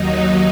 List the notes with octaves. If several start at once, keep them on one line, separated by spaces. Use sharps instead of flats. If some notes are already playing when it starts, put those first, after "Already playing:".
Already playing: D#2 D#3 F#3 D#4